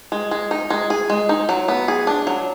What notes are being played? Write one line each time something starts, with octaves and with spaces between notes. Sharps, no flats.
G#3
G#3
D#4
G#3
G#4
G#3
D#4
F#3
B3
G#4
D4
F#3